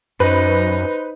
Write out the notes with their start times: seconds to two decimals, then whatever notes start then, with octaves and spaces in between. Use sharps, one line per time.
0.20 F#2 D#4 B4 C5